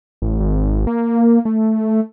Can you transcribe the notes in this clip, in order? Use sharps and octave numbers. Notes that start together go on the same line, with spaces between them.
A1
G#1
A#3
A3